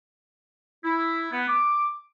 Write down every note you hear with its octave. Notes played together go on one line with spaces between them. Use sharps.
E4
B3
D6